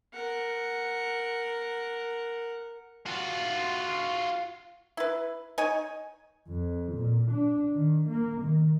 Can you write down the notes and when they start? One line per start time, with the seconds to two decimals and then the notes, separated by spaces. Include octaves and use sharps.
0.13 A#4 F#5
3.06 F4 F#4
4.97 E4 B4
5.58 D#4 C#5 G#5
6.48 F2
6.92 A#2
7.31 D4
7.75 D#3
8.09 A#3
8.42 D#3